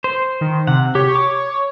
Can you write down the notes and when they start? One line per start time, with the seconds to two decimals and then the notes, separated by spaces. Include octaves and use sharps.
0.04 C5
0.41 D#3
0.67 C3 F#5
0.95 G4 C#5
1.16 D6